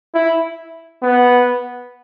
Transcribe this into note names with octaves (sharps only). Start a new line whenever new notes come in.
E4
B3